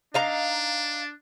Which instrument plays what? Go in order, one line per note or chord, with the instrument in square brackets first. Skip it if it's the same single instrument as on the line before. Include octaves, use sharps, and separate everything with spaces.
[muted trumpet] D4 [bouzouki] D#4 F5 A#5